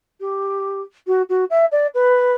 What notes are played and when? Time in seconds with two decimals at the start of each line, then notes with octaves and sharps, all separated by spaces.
0.20 G4
1.07 F#4
1.29 F#4
1.50 E5
1.71 D5
1.94 B4